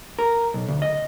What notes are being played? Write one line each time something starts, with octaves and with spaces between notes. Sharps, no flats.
A#4
B1
D2
D#5